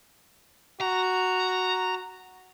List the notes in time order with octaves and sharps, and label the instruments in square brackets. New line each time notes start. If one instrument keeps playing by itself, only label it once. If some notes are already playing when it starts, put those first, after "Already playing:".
[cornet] F#4 [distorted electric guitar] A#5